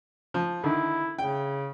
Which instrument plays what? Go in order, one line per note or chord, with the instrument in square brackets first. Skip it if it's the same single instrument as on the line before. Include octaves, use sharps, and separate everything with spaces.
[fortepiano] F3
[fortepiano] D3 D#3 [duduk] E4
[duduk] C#3 [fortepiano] G5